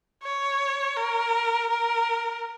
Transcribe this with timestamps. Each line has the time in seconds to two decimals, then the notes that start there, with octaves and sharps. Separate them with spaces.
0.23 C#5
0.96 A#4
1.69 A#4